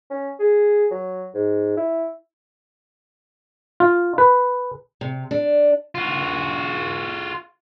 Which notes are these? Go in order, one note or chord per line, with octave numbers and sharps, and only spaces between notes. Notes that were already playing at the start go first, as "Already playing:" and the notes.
C#4
G#4
F#3
G#2
E4
F4
B4
C3
D4
F4 F#4